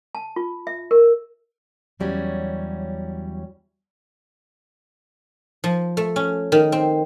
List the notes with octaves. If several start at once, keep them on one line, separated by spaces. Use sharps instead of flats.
A5
F4
E5
A#4
E2 F#3 G3 C#4
F3
A3
C#4
D#3
C4